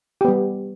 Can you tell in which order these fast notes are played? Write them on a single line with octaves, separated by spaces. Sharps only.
G4 B3 G3